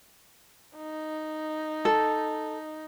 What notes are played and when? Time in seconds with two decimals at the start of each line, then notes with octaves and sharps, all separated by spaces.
0.77 D#4
1.85 A4